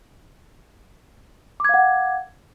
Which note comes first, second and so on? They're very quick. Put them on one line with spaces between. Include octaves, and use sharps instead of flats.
D6 G#6 F5 F#5